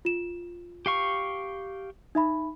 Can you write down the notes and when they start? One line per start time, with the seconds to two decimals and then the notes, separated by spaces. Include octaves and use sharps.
0.05 F4 E7
0.86 G4 F5 C#6
2.15 D#4 E5 B5